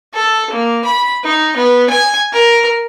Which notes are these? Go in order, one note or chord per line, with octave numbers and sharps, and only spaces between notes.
A4
A#3
B5
D#4
B3
G#5
A#4